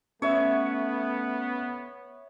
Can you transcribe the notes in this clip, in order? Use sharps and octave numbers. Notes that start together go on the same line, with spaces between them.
A3 B3 C#4 C#5 E5